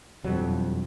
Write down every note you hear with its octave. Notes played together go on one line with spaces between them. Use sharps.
E1 F2 F#3 G3